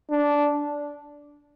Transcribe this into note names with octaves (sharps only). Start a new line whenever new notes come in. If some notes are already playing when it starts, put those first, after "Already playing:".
D4